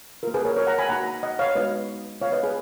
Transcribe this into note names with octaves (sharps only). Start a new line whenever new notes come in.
A#3 F4 A#4
G#4 B4
A#4 C#5
A#4 C#5
F#5 A#5
G#5 B5
A#3 D#4 F#4 F#5 A#5
D#5 F#5
C#5 F5
G#3 B3 D#4 F#4 B4 D#5
B3 F4 C#5 F5
B4 D#5
G#4 B4